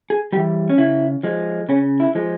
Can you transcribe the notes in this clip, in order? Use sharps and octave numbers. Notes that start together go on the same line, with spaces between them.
G#4
E3 G3 G4
C#4
C#3 E4
F3 G#3
C#3 C#4
E4
F3 G#3